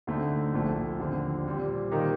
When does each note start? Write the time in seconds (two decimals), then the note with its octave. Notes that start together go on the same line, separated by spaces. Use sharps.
0.07 D2 D3 A3 C4 D#4
0.53 A#1 A#2 A3 C4
1.00 D#2 D3 F3 C4
1.45 A#2 G3 C4
1.92 D#3 A#3 D#4 G4